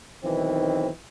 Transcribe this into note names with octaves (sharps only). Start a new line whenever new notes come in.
B1 D#3 E3 C4